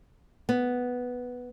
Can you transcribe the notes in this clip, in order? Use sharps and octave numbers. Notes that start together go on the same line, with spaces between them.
B3